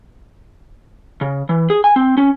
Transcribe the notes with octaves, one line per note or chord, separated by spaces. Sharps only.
C#3
E3
G#4
G#5
C4
C#4